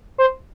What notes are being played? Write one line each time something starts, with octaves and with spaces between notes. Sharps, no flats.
C5